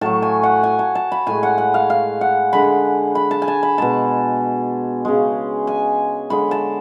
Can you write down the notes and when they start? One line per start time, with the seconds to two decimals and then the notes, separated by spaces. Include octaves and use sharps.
0.01 A2 F#3 A3 A5
0.22 G#5
0.43 F#5
0.63 G#5
0.79 A5
0.95 A5
1.12 B5
1.27 A2 G#3 G#5
1.43 F#5
1.58 F#5
1.74 F5
1.90 F5
2.21 F#5
2.53 D3 G#3 B5
3.15 B5
3.31 A5
3.42 G#5
3.48 A5
3.63 B5
3.78 B2 G#3 A5
5.05 C#3 G#3
5.67 G#5
6.30 D3 G#3 B5
6.51 A5